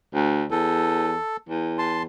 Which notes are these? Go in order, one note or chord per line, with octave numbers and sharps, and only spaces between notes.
D2
E2 A4
E2
A5 C6